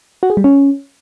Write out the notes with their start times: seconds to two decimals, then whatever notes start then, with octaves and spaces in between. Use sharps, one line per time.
0.23 F#4
0.30 G#4
0.37 G3
0.44 C#4